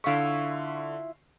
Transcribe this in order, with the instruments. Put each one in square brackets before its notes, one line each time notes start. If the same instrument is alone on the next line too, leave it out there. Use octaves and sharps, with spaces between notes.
[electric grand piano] D3 C#6 [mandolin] E4 F4 E5